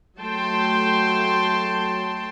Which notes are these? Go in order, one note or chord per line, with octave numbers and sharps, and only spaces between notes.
F#3 A3 G5 A5 C6